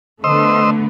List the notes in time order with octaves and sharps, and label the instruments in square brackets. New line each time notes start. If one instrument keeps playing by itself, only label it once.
[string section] D3 A3 B3 [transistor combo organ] C5 D#5 E6